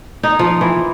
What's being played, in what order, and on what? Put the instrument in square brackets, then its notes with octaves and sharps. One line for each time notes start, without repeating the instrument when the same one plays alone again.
[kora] D#4
F3
E3